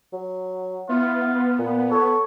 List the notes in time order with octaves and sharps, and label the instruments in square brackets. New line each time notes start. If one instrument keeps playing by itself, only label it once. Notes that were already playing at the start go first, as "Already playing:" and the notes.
[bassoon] F#3
[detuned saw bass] B3 [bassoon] E4 [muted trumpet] F4
[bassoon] A#2
[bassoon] A4 [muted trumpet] C#5